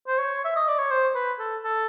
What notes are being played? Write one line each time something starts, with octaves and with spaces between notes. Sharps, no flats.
C5
C#5
E5
D#5
D5
C#5
C5
B4
A4
A4